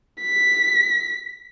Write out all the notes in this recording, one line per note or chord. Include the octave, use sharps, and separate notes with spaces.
B6